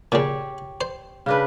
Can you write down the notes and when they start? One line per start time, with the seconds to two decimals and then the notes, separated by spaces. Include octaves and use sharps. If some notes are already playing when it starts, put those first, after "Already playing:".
0.12 A#2 C#3 G4 C#5
0.81 C5
1.26 C#3 D4 B4